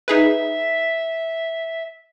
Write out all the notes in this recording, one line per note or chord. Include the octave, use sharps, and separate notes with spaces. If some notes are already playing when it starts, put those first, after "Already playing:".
D#4 G#4 B4 E5